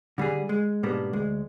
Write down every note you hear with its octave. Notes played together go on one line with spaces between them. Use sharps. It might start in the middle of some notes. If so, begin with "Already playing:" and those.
D3 G3 D4 G#4
G#3
G#2 B2 G3 A#3 B3 D4
D2 G#3